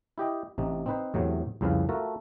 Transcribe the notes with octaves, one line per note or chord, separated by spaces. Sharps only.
E4 G4 D#5 G5
A1 C3 D#4
C4 D#4 B4 C5
E2 A2 C3 F#3
C2 F2 C#3 B4 F5
A3 F4 F#4 A4 A#4